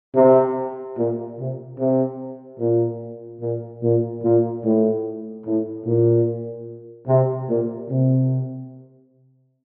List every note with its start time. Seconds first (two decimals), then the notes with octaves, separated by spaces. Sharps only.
0.16 C3
0.97 A#2
1.38 C3
1.79 C3
2.60 A#2
3.41 A#2
3.83 A#2
4.24 A#2
4.64 A2
5.46 A2
5.86 A#2
7.08 C3
7.49 A#2
7.90 C3